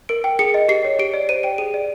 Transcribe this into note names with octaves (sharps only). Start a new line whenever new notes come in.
A#4 D7
G5
G#4 C#7
D#5
G4 C7
C#5
G4 D7
D5
C5 D#7
G5 D7
G#4 D#7
D5